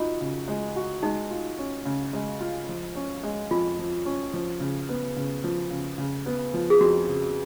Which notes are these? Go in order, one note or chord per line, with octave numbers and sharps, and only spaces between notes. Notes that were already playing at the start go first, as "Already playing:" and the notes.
Already playing: D#4 F4 F#4
C#3
G#3
F#4
G#3 D#4
F4
C#4
C#3
G#3
F4
F3
C#4
G#3
F2 F4
F3
C#4
F3
C#3
B3
C#3
F3
C#3
C#3
B3
F3
G#4
F2 F#4
C#3